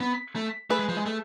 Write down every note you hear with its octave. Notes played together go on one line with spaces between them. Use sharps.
B3
A3
A3 G#4 B4
G#3
F3
G#3
A3